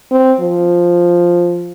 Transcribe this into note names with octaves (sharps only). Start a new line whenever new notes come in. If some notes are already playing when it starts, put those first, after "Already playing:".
C4
F3